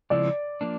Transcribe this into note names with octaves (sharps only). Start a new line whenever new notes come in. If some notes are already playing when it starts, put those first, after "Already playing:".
C#3 F3 G#3 C4 E4 D5
F3 A#3 D4